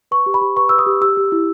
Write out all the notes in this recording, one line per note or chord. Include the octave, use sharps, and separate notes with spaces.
B4 C#6
G4
B5
G4
B4 C#6
B4 E6
D#6
G4
G4 E6
G4
E4